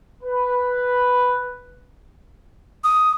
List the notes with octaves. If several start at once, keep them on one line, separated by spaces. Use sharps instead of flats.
B4
D#6